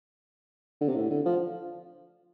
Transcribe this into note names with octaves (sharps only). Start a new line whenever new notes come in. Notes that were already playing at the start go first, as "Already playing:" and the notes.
D3
C3
A2
D3
F3